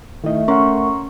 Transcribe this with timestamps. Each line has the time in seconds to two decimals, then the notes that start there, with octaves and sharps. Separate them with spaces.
0.24 D#3 A3 E4 D#5
0.48 C#4 A#4 F#5 A#5 C6 C#6